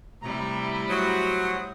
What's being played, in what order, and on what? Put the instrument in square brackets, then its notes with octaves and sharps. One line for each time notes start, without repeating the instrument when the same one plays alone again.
[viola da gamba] A2 G3 E4 [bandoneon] C3 A#5
[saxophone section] F#3 [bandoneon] C5 D#6